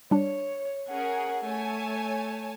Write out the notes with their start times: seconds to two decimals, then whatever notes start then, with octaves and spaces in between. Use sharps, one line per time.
0.11 G3 D4 C#5
0.89 C#4 G#4 A#4 F#5
1.44 A3 C#5 G#5 A5